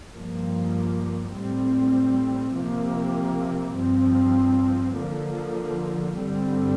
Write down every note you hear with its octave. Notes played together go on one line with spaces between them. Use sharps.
G2 F3 A#3
A2 G3 C4
C3 F3 A#3
G2 F3 C4
D3 F3 A#3
G2 D3 G3 C4